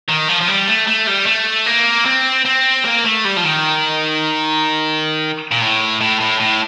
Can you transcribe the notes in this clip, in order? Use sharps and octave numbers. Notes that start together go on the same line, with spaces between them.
D#3
F3
F3
G3
A3
A3
G3
A3
A#3
C4
C4
A#3
A3
G3
F3
D#3
A#2
A2
A2
A2
A2